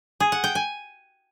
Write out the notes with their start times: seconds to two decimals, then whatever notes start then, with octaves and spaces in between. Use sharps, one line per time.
0.20 G#4
0.32 F#5
0.44 G5
0.55 G#5